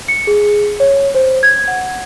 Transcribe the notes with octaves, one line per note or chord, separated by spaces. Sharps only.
C#7
G#4
C#5
C5
G#6
F#5